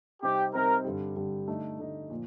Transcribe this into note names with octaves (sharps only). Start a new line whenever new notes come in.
C3 G3 C4 D#4 G4
C3 G3 C4 D#4 A#4
G2 D3 G3
G2 D3 G3
D3 A3 D#4
D3 A3 D#4
A#2 F3